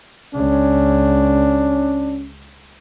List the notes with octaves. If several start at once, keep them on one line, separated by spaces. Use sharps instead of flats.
C#2 C#4 D4